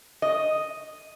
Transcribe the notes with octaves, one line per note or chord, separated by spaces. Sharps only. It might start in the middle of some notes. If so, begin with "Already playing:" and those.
D#5